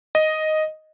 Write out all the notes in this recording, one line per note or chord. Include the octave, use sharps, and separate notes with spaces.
D#5